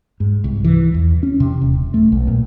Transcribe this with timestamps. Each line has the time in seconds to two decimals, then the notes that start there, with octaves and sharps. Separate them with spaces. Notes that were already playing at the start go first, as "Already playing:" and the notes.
0.20 G#2
0.44 C2
0.64 E3
0.94 E2
1.23 C#4
1.40 C3
1.61 D#1
1.94 A3
2.12 B1
2.27 A#2